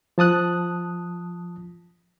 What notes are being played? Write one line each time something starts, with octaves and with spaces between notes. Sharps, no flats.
F3 A5 D#6 F#6